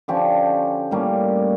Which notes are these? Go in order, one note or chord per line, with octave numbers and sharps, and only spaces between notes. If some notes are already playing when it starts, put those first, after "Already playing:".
D3 F3 C#4 G4
A2 G3 A#3 C#4